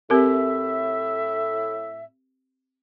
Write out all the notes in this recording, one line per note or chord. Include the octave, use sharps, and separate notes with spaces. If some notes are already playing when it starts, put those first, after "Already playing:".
A2 C4 G4 A#4 E5